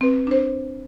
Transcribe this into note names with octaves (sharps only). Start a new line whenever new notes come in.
C4 B4
D4 C5